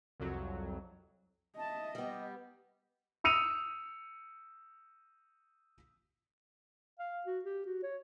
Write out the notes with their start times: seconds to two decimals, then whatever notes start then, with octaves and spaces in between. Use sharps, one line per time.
0.20 C2 F2 F#3
1.56 D#5 E5 A5
1.95 G3 B3 G4
3.24 D#6 E6 C#7 D#7 F7
6.99 F5
7.26 F#4
7.44 G4
7.66 F#4
7.83 C#5